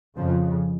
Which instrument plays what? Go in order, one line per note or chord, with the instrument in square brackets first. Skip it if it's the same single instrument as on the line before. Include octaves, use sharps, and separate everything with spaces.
[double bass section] F2 C#3 F3